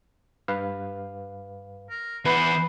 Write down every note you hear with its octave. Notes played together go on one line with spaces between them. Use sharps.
G2 B4 F5
A#4
E3 B3 B4 C5 F#5 B5